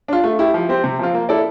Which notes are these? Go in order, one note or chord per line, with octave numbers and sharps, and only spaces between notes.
D4 F4
A3
E4 G4
F3
C4 G4 C5
C3
F3 C4 F4
A#3
E4 A4 D5